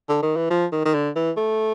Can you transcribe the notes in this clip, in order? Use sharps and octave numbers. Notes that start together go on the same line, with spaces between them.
D3
D#3
E3
F3
D#3
D#3
D3
E3
A3